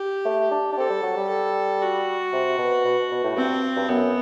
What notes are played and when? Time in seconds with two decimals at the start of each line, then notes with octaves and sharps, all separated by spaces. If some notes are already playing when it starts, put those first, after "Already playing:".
Already playing: G4
0.25 A3
0.51 D4
0.72 D4
0.77 C4 A4
0.90 G3
1.03 F#3
1.17 G3
1.29 A4
1.81 F#4
2.33 C3
2.58 B2
2.85 B2
3.11 B2
3.24 A2
3.36 G2 C4
3.76 G2
3.88 F#2 B3